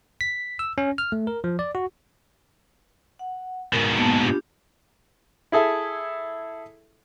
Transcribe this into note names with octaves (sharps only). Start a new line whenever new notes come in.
B6
E6
C#4
F6
A3
A#4
F3
D5
F#4
F#5
G#2 B2 A#4
A#3 B3 A5
D4 F4 G4
E4 G#4 A4 E5